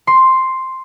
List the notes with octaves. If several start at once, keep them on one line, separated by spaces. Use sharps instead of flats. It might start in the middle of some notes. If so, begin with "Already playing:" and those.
C6